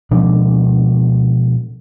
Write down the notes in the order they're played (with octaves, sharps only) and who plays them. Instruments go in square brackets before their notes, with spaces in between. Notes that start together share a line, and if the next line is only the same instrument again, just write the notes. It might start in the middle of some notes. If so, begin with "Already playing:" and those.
[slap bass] B2 F3 G#3 D4